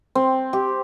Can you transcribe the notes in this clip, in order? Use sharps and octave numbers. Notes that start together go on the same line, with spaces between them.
C4
G4